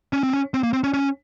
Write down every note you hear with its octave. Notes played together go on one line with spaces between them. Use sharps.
C#4
C4
C#4
C4
A#3
C4
C#4
C#4